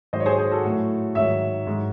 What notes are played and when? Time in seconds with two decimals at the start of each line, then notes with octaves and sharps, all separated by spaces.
0.13 G#2 D#3 F#3 C5 D#5
0.20 C#5
0.26 G#4 C5
0.39 G#4 C5
0.51 F#4 A4
0.64 A2 F#3
1.15 G#2 D#3 F#3 C#5 E5
1.67 G#2 F#3